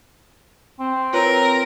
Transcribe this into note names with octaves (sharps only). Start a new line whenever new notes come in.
C4
F4 A#4 B4 C#5